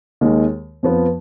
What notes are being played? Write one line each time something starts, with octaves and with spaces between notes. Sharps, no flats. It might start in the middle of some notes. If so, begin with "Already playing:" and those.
D#2 D#3 G#3
F2 F3 B3